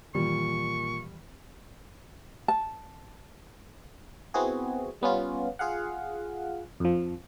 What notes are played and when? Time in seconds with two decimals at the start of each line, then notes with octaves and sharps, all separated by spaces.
0.15 A#2 D#3 E3 G3 C#6
2.48 A5
4.34 B3 C4 E4 F#4 G#4
5.01 G3 B3 C#4 F4
5.59 F4 G#4 F5 F#5
6.80 F2 F3